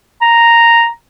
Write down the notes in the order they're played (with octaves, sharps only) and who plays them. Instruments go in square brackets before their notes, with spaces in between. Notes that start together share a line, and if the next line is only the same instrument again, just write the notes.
[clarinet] A#5